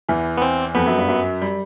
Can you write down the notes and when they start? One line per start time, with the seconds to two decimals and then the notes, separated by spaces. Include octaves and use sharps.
0.09 E2 E3
0.38 B3
0.42 C4
0.75 F2 F3 B3
0.86 F#2 F#3
0.98 G2 G3
1.08 F#2 F#3
1.42 G3